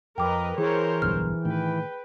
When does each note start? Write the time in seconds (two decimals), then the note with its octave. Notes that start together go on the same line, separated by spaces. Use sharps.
0.18 F2 A#4 B4 D#5 G5 D6
0.58 E3 G#4 A#4 C5 C#5
1.02 D1 B1 G2 F6
1.45 A2 D#3 B4 G5